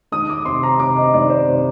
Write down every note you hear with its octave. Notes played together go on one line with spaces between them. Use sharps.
D#3 D#6
D6
C3 C6
A#5
C3 D6
D#5
D#3 D5
C5
C3